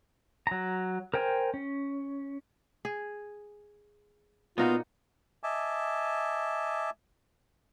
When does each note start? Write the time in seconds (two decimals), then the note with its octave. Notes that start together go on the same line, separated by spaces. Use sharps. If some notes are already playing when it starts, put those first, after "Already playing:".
0.47 F#3 A#5
1.14 A#4 C5 G5 G#5
1.54 C#4
2.85 G#4
4.58 A#2 B3 D#4 F4 F#4
5.43 D#5 E5 G#5 A5 D6